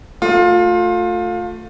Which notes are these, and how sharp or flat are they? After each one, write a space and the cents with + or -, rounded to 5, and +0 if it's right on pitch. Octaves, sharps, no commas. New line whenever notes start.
A3 +15 F4 +25